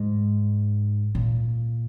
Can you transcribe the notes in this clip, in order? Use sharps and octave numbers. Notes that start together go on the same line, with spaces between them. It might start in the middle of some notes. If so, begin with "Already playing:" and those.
Already playing: G#2
A#2